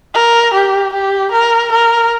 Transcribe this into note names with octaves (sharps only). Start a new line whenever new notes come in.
A#4
G4
G4
A#4
A#4